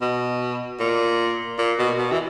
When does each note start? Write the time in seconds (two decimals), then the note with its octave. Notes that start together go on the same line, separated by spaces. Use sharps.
0.01 B2
0.80 A#2
1.59 A#2
1.79 B2
1.98 B2
2.12 E3